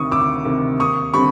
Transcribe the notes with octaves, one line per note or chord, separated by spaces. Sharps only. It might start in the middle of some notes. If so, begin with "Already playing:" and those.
Already playing: D2 C3 D#3 C#6 D#6
D2 D6 E6
C3 D#3
D#2 C#6 D#6
D3 G3 C4 B5 C#6